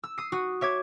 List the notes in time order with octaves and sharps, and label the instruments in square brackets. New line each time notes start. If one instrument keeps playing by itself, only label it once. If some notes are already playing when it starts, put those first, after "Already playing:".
[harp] E6
D#6 C7
F#4 D#6
C#5 E5 D6 G#6